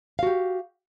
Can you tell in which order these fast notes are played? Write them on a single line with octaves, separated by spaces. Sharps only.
F5 F#4 G4